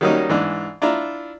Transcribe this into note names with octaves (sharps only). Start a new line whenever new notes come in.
D#3 F#3 G3 A#3 C#4 D#4
G#2 E3 D4
D4 E4 F4 A#5